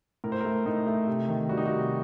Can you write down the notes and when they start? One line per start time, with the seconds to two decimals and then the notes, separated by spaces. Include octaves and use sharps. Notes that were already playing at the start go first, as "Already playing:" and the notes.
0.24 A2 A#4
0.32 C5
0.41 A3 A#4
0.66 A2 D#4
0.87 A3
1.07 C3
1.29 D#3
1.49 G3 F#4
1.57 D#4
1.65 F#4
1.70 C3